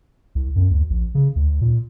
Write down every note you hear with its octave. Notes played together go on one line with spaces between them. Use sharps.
C2
F#2
D2
A#1
C#3
D2
A#2